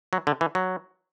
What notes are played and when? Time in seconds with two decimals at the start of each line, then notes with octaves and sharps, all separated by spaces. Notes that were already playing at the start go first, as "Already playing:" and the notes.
0.13 F#3
0.27 D3
0.41 E3
0.55 F#3